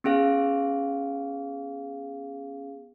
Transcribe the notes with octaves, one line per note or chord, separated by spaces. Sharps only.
B3 C#4 G#4 F5